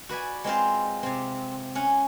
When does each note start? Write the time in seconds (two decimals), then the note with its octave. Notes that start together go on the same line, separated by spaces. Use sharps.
0.09 F#4 B4 D5 G#5
0.44 G#3 C4 F4 C5
1.03 C3 C4
1.75 C#4 F#5